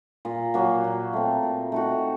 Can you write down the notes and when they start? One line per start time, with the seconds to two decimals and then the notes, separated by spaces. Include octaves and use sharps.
0.25 A#2
0.54 F#3 A#3
0.84 A#2
1.13 A3 C4
1.43 A#2
1.72 A3 D#4 F#4